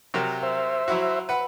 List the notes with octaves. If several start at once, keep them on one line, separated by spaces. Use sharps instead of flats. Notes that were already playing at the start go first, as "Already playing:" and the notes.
C3 F#3 A#4
C5 E5
F#3 E4 F#4
B4 F#5